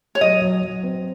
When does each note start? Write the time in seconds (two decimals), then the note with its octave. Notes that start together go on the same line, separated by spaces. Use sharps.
0.15 C#5
0.21 F#3 D#5
0.42 F#3
0.62 F#3
0.83 C4